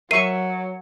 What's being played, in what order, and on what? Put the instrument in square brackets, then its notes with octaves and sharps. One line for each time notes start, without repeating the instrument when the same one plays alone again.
[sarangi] F#3 [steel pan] A#4 E5 C#6 [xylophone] C7 D#7